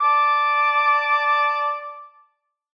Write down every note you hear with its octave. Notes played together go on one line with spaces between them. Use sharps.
D5 A5 D6